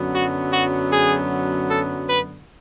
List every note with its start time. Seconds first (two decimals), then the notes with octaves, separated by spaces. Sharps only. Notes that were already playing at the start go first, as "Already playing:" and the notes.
Already playing: F#2 D3 F#3 B3
0.14 F#4
0.52 F#4
0.91 G#4
1.68 A4
2.08 B4